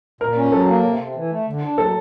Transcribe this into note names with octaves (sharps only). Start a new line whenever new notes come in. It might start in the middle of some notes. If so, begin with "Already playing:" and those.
A#2 A#4
C#4
F#3 A4
A#3
C3
C3
E3
A3
D3
D4
F#3 A4